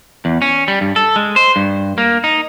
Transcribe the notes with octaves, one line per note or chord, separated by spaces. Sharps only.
E2
C#4
G3
G2
A4
G#3
C5
G2
A#3
D#4